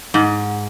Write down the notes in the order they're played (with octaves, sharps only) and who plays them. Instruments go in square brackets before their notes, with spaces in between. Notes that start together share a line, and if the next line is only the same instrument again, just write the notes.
[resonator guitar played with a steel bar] G#2